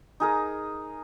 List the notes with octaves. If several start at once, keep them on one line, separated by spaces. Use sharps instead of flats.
D#4 G#4 A#4